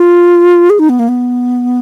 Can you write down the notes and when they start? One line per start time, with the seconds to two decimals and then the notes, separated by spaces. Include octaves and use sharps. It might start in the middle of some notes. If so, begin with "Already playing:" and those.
Already playing: F4
0.70 G#4
0.79 D#4
0.89 B3
0.99 A#3
1.08 B3